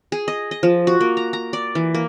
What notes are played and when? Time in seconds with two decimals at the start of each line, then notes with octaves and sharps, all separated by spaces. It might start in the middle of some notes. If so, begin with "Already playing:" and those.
0.12 G#4
0.28 D#5
0.51 D#5
0.63 F3
0.87 F#4
1.01 A#3
1.17 A#5
1.33 A#5
1.53 D5
1.75 E3
1.94 A#3